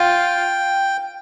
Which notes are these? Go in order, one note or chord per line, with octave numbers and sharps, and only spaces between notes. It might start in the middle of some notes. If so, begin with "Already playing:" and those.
Already playing: F4 G5